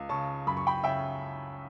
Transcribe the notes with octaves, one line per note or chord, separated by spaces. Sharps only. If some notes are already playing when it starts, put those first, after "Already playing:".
Already playing: C#2
C#3 A5 C#6
F#2 B5
C#6
G5 B5
C#3 E5 G5